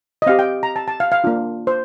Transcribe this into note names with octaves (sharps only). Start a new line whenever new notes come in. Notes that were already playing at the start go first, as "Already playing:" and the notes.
D#5
C4 G4 F5
G5
A#5
A5
A5
F5
F5
A#3 D4 F4
C5